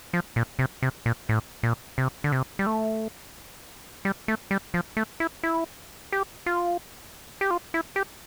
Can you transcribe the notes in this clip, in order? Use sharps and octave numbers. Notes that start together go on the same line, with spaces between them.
F3
A#2
C3
C3
A#2
A2
A#2
C3
D3
C3
G3
A3
G3
A3
G3
F3
A3
E4
E4
G4
F4
G4
F4
E4
G4